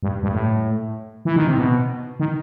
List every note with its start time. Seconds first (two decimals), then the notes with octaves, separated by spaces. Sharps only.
0.03 G2
0.23 G2
0.33 A2
1.25 E3
1.36 D#3
1.47 C3
1.58 B2
2.20 D#3